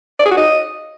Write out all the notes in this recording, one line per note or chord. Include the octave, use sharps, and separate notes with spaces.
D5
G#4
F#4
D#5